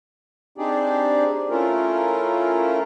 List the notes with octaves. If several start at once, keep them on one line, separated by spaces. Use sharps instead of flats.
C4 D4 D#4 G4 G#4 D5
A3 C#4 E4 F4 A#4